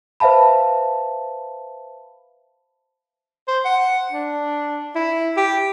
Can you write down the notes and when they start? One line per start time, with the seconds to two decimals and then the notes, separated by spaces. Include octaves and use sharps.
0.20 B4 C5 E5 F5 A5 B5
3.48 C5
3.65 F#5
4.11 D4
4.95 E4
5.37 G4